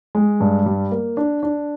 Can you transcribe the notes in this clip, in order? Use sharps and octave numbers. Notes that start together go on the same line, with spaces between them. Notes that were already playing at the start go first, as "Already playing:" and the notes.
G#3
G2
G3
A#3
D4
D4